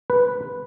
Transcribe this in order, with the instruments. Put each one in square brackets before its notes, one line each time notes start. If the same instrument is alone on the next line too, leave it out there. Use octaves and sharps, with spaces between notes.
[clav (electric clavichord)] B4